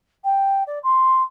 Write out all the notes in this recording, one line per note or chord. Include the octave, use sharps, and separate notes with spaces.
G5
D5
C6